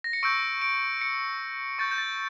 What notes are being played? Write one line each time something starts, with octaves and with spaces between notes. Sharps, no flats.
A#6
C#7
C#6 E6 G6 D7
D7
C#7
C#6 G6 A6
G6
A6